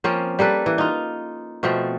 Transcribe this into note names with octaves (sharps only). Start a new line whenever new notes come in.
F3 A#3 C4 C#4
G3 A#3 A4 B4
E3
D#4 F4
B2 F3 A3 C4